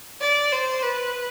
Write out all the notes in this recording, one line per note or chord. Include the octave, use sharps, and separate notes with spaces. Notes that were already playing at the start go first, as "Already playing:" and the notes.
D5
C5
B4